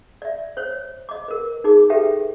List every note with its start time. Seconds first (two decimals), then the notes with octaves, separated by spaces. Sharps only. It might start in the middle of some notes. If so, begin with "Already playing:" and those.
0.22 D5 E5
0.57 C5 C#5
1.09 D#5 D6
1.28 A#4 B4
1.64 D#4 G#4 D6
1.90 G4 A4 B4 E5 G5